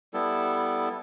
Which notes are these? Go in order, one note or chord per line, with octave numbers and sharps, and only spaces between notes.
G3 B3 E4 A4